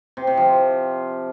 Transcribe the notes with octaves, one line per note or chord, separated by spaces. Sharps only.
C3
C3
F3